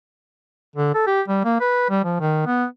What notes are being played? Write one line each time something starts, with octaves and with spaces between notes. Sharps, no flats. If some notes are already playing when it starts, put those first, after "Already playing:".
D3
A4
G4
G3
A#3
B4
G3
F3
D#3
B3